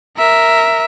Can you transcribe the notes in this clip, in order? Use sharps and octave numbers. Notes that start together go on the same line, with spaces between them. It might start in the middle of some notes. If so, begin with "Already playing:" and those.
A#4 E5